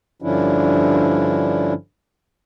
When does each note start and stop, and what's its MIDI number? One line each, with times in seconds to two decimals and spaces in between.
0.22 1.73 43
0.22 1.73 50
0.22 1.73 53
0.22 1.73 61
0.22 1.73 62
0.22 1.73 64